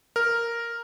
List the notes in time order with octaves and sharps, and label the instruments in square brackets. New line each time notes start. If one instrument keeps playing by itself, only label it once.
[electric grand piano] A#4 F6